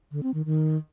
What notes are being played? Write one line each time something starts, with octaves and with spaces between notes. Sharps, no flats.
D3
C4
D#3
D#3